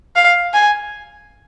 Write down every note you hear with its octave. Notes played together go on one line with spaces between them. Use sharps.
F5
G#5